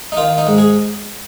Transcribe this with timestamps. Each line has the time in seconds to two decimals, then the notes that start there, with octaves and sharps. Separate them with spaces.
0.12 D#4
0.17 D#3 F4
0.38 D#4
0.47 G#2
0.58 G#4